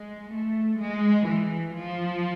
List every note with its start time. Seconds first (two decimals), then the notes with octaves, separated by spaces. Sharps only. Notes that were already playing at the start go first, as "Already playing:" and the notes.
Already playing: G#3
0.34 A3
0.80 G#3
1.28 E3
1.76 F3